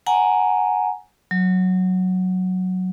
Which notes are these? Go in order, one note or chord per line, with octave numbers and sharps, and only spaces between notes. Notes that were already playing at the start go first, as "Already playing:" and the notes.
F#5 G#5 A#5
F#3